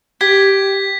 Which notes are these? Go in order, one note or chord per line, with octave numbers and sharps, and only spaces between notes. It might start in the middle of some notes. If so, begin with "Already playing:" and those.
G4 G#6 B6